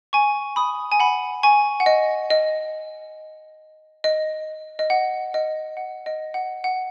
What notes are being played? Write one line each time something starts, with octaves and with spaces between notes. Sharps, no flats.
G#5 C#6
B5 D#6
G#5
F#5 B5
G#5 C#6
F#5
D#5
D#5
D#5
D#5
F#5
D#5
F#5
D#5
F#5
F#5